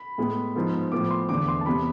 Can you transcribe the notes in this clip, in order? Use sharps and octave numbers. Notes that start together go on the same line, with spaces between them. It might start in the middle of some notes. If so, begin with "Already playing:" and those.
Already playing: B5
A2 G#3 B3
G#2 F3 B3
A2 F3 B3 D6
C6
E2 D3 A3 D6
C6
A5
E2 C3 E3 B3 B5